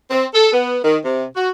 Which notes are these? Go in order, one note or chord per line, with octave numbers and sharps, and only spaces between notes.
C4
A4
B3
D#3
C3
F#4